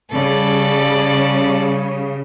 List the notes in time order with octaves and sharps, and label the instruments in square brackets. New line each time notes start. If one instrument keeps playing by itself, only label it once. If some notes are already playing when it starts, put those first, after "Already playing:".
[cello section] C#3 G3 [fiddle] A4 D5